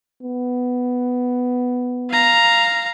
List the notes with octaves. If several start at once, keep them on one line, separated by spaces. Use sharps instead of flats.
B3
F5 A#5